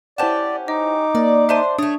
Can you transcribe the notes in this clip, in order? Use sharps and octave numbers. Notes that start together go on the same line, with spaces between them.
C#4 E4 G4 C5 D5 F#5 A5 E7
D#4 D#5 D6
A#3 D5
D4 C5 E5 A5 D#7
A3 D4 C#5 D#6